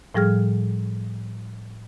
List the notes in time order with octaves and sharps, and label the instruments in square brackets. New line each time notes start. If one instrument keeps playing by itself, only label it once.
[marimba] A2 F3 G3 G#4 F6